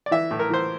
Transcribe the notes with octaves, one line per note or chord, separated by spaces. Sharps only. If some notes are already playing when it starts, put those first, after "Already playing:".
D5
E3 E5
A2
A#4
E3 C5